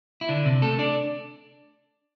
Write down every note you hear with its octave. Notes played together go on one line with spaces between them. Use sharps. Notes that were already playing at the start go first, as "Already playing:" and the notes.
E4
D3 D4
C3 C4
A3 A4
D4 D5